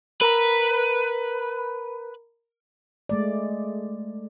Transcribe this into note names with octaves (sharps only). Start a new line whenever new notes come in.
A#4 B4 A#5 B5
G#3 A3 D5